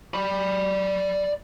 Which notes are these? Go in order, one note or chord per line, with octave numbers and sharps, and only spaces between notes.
D5 B5